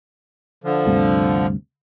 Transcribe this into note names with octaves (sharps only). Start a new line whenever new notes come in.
D3 F3
D2 G2 C3